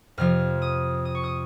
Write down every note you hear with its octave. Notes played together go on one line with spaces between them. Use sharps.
F2 C3 F3 F6
D#6
D#6
C#6
D#6